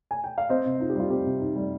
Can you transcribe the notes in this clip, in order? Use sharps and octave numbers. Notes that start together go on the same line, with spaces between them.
G#5
G5
F5
C4 C5 D#5
C3
D#4 F4
G4
G3 F4
C4 G4
C3
D#4
G3